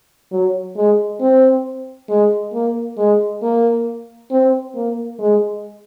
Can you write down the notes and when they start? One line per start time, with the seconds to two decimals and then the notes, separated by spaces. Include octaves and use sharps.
0.31 F#3
0.76 G#3
1.20 C4
2.09 G#3
2.53 A#3
2.98 G#3
3.42 A#3
4.31 C4
4.75 A#3
5.20 G#3